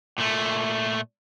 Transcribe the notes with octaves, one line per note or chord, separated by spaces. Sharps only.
A#2 A3